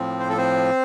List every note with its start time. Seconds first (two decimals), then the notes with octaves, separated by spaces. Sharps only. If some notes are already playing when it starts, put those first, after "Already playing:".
Already playing: A2 F3 C4
0.20 C5
0.29 A4
0.37 C4 C5